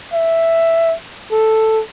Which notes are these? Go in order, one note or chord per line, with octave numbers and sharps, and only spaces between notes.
E5
A4